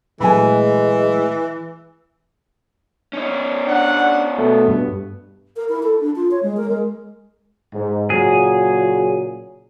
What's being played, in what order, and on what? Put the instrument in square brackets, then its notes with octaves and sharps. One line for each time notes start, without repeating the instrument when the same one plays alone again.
[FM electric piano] A#2 F#3 A3 [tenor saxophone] E3 [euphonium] G#3 [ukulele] G#5 B5
[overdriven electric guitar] C#4 D#4
[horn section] D4 D5 F#5
[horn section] B2 B3 [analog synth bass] A3
[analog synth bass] G2
[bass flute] A#4
E4
A4
D4
F4
C#5
G#3
A#4
G#3
[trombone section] G#2
[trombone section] A#2 C#3 F#3 [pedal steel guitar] G#4